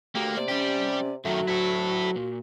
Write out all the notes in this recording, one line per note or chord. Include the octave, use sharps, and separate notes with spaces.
A3 A#3 F#4 G4
C3 A#3 D5
G3 C#4 G4
F#2 D#3 F#3 A3 F#4
D2 E4 A4
A#2